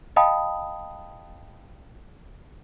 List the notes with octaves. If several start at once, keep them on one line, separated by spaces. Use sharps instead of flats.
D#5 F5 G5 A5 B5 D#6